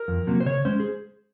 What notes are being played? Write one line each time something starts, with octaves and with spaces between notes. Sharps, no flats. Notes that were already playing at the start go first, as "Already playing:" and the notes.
Already playing: A#4
F2
C3 F#3 A#3
C5
C#3 C#5
G#3 C#4 C5
G#4